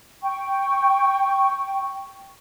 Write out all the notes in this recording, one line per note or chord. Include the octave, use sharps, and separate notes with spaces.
G5 C#6